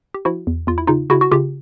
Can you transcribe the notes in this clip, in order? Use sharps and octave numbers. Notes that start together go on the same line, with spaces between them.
G4
F3 E4 F#4
E2
E2 F4
E4
C#3 D#4 F4
C#3 E4 F#4
F#4
C#3 F4 G4